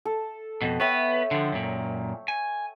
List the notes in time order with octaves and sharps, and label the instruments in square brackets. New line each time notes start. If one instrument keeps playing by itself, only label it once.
[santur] A4
[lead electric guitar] F2 B2
[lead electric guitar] B3 B4 [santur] C#5 E5 G5
[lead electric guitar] D3 F3
F#2 A#2
G#5